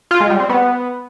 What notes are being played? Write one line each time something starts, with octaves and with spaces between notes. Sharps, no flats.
F4
G#3
G3
C4
B3